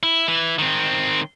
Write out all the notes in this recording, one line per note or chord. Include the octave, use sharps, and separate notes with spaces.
E4
E3 E4
D#3 C4